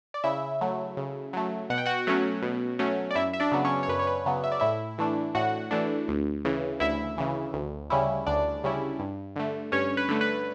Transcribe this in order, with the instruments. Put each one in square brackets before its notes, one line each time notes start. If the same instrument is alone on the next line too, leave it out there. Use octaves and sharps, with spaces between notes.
[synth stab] D5
C#3 E4 E5
F#3 A3
C#3
F#3 A3
B2 F#5
G5
F#4 F#5
F#3 A3 C#4
B2
F#3 A3 C#4
D5
F#2 E4 E5
E5
D4 D5
C#3 F#3 B3
C#4 C#5
C#5
F#2 B4
C#5
B4
C#3 F#3 B3
E5
D5
A2 E4 E5
E3 A3 D4
A2 F#4 F#5
E3 A3 D4
D2
C#3 E3
D2 E4 E5
C#3 E3
D2
C#3 G3 C#4 E4
D2 D4 D5
C#3 G3 C#4 E4
G2
D3 A3
G2 C#4 C#5
B4
D3 A3
B4